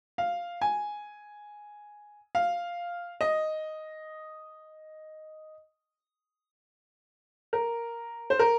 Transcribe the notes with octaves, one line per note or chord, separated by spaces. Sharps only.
F5
G#5
F5
D#5
A#4
C5
A#4